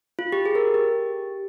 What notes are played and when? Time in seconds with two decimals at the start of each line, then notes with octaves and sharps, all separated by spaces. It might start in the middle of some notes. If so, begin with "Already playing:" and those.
0.19 F4
0.32 G4
0.46 G#4
0.55 A#4
0.74 G4